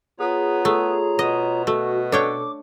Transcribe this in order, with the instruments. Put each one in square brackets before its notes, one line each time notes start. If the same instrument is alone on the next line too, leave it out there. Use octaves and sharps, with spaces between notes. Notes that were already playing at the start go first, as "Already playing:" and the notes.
[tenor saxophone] B3 [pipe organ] F4 C#5 A#5 [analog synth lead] G#4
[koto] A3 [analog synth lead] G#4
[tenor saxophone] B2 [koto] D#5
[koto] A3 [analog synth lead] F#4
[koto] D4 C#5 G5 [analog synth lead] A4 [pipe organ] D6